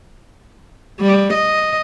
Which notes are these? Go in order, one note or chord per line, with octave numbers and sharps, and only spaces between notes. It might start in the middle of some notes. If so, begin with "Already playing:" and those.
G3
D#5